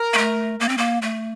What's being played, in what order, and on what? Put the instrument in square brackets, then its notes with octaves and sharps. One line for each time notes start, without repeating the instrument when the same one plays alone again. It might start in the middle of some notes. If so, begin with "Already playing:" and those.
Already playing: [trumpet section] A#4
[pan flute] A#3
A3
A#3
C4
A#3
A3